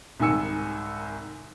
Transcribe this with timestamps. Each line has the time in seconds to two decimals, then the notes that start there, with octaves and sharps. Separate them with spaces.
0.20 C2 G#2 D#3 G#5 E6 C#7